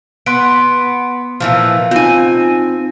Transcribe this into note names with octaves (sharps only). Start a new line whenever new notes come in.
B3 C6 F#6 D7
A#2 E3 F3
C4 D#4 F4 G#5